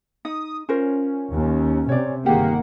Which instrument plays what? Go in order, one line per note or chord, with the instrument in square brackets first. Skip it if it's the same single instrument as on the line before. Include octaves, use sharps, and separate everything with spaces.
[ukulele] D#4 [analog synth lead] D#6
[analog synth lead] C#4 [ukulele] F4 A#4 C5
[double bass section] D#2
[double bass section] C3 [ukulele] C#5 D5
[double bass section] G1 D#3 A#3 [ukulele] G4 G#4 [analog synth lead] F#5